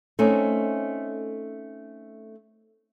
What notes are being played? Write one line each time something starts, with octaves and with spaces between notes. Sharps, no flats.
A3 C4 C#4 D#4